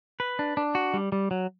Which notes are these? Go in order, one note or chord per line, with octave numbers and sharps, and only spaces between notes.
B4
D4
D4
F#4
G3
G3
F#3